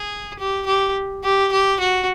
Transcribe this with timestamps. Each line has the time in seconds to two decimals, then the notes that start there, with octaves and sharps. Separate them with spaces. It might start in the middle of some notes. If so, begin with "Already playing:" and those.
Already playing: G#4
0.39 G4
0.66 G4
1.24 G4
1.52 G4
1.80 F#4